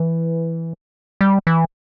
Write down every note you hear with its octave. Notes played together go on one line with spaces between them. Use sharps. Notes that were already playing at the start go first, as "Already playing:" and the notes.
Already playing: E3
G3
E3